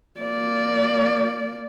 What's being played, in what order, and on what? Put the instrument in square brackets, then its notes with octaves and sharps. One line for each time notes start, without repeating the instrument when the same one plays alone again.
[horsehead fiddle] A#3 D5